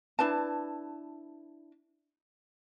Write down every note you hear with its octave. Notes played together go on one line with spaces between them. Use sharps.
D4 E4 B4 A5